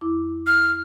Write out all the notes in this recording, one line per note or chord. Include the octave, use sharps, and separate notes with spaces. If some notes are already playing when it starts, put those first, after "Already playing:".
F2 E4 D6
F6